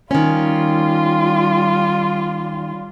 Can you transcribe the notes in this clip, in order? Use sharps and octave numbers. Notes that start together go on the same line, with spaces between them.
D#3 G3 C#4 F4